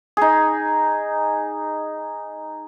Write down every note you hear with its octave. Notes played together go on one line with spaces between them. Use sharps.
D#4 G#4